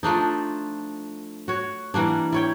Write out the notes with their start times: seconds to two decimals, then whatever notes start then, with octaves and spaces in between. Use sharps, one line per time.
0.03 F3 A3 D4 D#4
1.48 F#4 C#5
1.94 E3 G3 A#3 D4
2.32 E4 C#5 G5